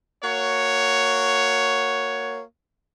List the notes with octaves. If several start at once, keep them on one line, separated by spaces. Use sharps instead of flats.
A#3 F#4 C#5